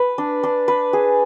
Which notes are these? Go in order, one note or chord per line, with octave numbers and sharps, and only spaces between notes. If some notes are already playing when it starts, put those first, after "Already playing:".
Already playing: B4
D4
D4
B4
G#4